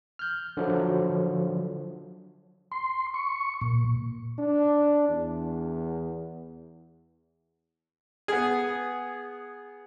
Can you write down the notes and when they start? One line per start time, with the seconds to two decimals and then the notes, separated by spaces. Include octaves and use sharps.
0.19 F6 G6
0.57 D3 F3 F#3
2.72 C6
3.14 C#6
3.61 A#2
4.38 D4
5.09 E2
8.28 B3 G#4